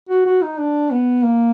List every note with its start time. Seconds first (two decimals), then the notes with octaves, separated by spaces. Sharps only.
0.09 F#4
0.26 F#4
0.42 D#4
0.58 D4
0.91 B3
1.24 A#3